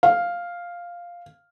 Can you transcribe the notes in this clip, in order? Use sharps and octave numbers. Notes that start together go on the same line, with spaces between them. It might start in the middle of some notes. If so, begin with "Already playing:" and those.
F5